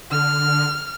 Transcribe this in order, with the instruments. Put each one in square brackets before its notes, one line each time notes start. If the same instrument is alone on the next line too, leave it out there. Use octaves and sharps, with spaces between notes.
[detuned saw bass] D3 [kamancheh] F6